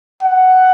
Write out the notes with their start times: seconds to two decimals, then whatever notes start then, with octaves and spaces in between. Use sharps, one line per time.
0.22 F#5